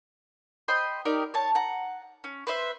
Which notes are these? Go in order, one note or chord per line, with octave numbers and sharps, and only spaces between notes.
C5 D#5 G5 B5
D#4 G4 A#4 D5
C#5 A5
F#5 A#5
C#4
B4 C5 E5